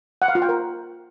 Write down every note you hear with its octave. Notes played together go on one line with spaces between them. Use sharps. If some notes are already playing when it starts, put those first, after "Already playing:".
F#5
F5
F4
G5
A#4